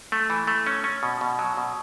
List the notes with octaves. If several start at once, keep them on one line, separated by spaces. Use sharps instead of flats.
A3
E3
A3
C#4
C#4
B2
B2
F#3
B2